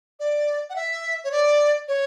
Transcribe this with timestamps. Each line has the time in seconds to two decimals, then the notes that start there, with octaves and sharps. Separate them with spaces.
0.19 D5
0.70 F#5
0.76 E5
1.24 C#5
1.31 D5
1.88 C#5